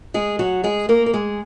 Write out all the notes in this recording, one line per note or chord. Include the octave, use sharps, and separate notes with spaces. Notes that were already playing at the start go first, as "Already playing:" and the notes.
G#3 G#4
F#3 F#4
G#3 G#4
A#3 A#4
A#4
G#3 G#4